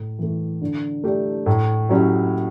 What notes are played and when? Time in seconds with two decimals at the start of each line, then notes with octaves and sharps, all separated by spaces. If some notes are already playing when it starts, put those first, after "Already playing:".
Already playing: A2
0.19 E3 A3
0.62 D3
1.04 A3 D4 G4
1.46 A2
1.89 F#3 C#4 E4 G4